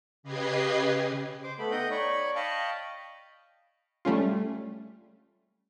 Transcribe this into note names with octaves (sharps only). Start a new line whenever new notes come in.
C#3 G4 B4 D#5 G#6 C7
C5 D6
A3 B3 B5
D#4 D#5 F#5 G5 D#6 G6
C#5 D5 B5 C#6
D#5 F5 G5 A5 B5 C#6
G3 A3 C#4 F4